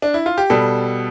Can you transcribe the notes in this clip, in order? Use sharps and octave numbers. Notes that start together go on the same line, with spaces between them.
D4
E4
F4
G4
B2 G3 A4